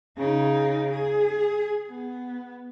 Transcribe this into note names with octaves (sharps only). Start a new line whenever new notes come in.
C#3 D#4
G#4
B3